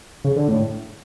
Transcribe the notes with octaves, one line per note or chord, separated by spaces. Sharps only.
C#3
D3
A2